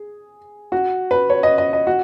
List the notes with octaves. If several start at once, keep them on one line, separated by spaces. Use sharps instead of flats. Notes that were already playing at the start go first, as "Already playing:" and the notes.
Already playing: G#4
F#4
B4
C#5
D#5
D#5
D#5
F#4